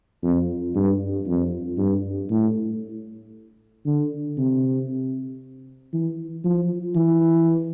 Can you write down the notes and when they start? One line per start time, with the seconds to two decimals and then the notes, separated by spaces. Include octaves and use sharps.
0.23 F2
0.75 G2
1.27 F2
1.78 G2
2.30 A2
3.86 D3
4.37 C3
5.93 E3
6.44 F3
6.96 E3